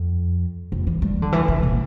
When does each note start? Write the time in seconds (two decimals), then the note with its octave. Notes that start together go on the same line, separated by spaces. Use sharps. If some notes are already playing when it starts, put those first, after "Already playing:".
Already playing: F2
0.72 F2
0.87 E3
1.02 G3
1.22 D3
1.33 E3
1.48 D3
1.63 B2